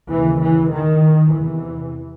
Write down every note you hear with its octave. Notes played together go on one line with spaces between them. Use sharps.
D#2 C#3 E3
E3
D#3
E2 C3 E3